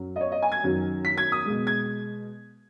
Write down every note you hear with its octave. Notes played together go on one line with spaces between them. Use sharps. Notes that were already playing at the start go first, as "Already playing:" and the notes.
Already playing: F#2 F#3
D#5
C#5
D#5
G#5
G#6
F#2 D#3 F#3
B6
G#6
D#6
B2 G#3
G#6